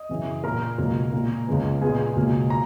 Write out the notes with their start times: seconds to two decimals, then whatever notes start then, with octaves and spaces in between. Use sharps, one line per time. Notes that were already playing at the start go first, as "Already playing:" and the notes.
Already playing: D#5 D#6
0.09 F#2 C#3 E3
0.44 A#2 A#3 A#4 A#5
0.78 C#2 B2 F#3 A#3
1.13 A#2 A#3
1.47 C#2 C#3 G#3 B3
1.81 A#2 G#3 B3 G#4 G#5
2.16 C#2 B2 A#3
2.50 A#5